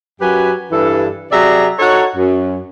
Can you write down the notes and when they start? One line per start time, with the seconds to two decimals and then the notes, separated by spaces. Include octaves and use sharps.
0.21 F#2 F#3 G4 B4 G#5
0.71 G2 E3 A4
1.32 C3 F#3 G#4 D5 E5 A#5
1.78 D#4 F#4 A4 C#5
2.16 F#2